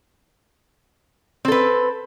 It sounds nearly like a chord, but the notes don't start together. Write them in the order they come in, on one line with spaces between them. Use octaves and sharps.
C4 A4 B4